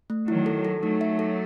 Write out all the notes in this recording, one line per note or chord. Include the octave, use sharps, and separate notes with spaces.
A3
D#3 F#3 E4
A4
A4
F#3 A3 D#4
E5
A4